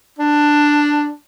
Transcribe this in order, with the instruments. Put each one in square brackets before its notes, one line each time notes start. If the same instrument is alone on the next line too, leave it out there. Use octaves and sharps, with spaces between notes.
[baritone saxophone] D4